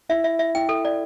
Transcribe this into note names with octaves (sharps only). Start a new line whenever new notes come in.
E4 E5
E5
E5
E4 G5
A4
D5